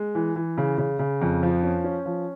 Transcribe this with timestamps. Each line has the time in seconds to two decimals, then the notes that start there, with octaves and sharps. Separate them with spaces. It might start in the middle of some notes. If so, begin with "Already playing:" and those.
Already playing: G#3
0.15 E3
0.36 E3
0.58 C#3
0.78 C#3
0.99 C#3
1.21 F2
1.43 F3
1.63 C#4
1.84 C#4
2.06 F3